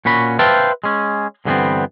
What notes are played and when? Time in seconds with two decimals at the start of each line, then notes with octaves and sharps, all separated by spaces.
0.05 A#2 C#4 F#4 B5
0.39 B4 C5 E5 F5 G5 A5
0.84 G#3 C#4
1.45 G2 D3 E3 G#3 B3 C4